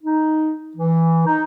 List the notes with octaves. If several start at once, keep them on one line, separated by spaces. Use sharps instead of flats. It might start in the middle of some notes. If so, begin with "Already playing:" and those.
D#4
E3
D#4